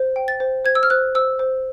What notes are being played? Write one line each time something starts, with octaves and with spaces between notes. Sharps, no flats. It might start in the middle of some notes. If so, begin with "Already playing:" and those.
Already playing: C5
G5
A6
C5
C5 G#6
E6
F6
C5 F#6
C5 E6
C5